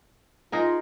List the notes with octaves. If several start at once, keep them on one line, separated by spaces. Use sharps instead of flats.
D#4 F4 G#4 A#4